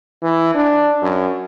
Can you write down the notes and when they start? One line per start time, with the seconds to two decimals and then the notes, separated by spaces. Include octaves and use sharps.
0.22 E3
0.55 D4
1.02 F#2